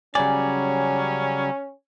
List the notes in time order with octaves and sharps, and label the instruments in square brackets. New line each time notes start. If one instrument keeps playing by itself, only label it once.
[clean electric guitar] C#3 D5 [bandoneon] F#3 G3 [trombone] C#4 [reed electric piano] G#5